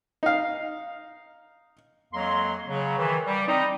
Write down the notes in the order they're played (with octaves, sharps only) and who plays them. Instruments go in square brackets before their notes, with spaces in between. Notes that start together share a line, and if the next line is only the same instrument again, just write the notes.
[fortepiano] D#4 F5
[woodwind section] F2 F#3 G#3 A#3 A#5 C6
C#3 F#3
D#3 E3
G3
G3 C4 D#4